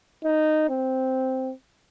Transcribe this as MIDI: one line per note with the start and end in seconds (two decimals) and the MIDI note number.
0.24 0.67 63
0.70 1.52 60